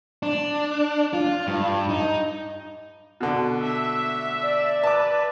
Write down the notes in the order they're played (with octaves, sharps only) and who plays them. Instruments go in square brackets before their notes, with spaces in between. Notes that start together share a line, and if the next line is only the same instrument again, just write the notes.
[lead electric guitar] D4
F4
G2
D#4
[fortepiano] B2 D3
[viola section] E5
[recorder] D5
[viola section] B4 [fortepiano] A5 D6